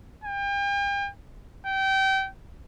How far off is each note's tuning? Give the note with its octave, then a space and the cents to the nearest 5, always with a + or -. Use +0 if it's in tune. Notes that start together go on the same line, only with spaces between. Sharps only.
G5 +40
G5 -25